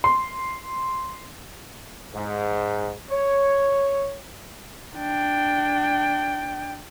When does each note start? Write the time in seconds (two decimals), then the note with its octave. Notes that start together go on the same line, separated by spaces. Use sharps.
0.04 C6
2.14 G#2
3.10 C#5
4.95 D4 G5